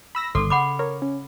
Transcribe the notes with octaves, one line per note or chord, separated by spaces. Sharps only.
B5 E6 A#6
G1 D3 A4 C6 D6
C#3 F#5 B5 D6
A#4 C#5
C#4